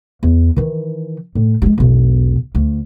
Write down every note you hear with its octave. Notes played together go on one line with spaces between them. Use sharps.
E2
D#3 E3
A2
F#3 G#3
E1 B1
D2